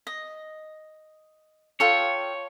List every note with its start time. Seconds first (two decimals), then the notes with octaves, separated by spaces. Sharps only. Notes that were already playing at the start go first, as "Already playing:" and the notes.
0.07 D#5
1.80 F4 A4 C#5 G5